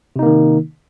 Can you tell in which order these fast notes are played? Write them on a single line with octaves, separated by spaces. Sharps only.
C3 D#4 A#3 D#3